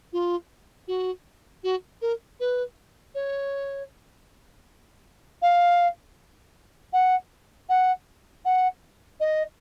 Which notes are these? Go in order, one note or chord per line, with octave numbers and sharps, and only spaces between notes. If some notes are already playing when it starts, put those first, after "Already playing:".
F4
F#4
F#4
A#4
B4
C#5
F5
F#5
F#5
F#5
D#5